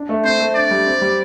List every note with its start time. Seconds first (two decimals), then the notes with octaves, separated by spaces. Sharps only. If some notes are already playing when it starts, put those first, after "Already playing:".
Already playing: D4
0.09 A3
0.25 C4 C5
0.40 A3
0.55 D4 D5
0.71 G3
0.86 C4
1.02 G3